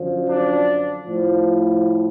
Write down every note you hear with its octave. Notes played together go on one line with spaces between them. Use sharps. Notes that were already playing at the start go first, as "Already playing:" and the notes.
Already playing: F#2 D3 F3
D4
A2 F3